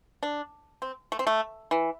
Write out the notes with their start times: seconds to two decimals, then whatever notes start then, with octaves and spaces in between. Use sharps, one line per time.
0.23 D4
0.82 C4
1.12 A3
1.19 C4
1.27 A3
1.71 E3